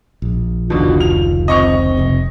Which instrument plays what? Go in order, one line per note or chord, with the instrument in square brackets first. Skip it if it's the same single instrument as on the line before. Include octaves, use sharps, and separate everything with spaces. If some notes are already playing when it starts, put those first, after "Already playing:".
[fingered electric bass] A#1
[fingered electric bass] F1 C#2 D#3 [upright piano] B2 D3 [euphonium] F4
[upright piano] F7
[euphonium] C4 [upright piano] D#5 C#6 F7
[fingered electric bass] F1 C3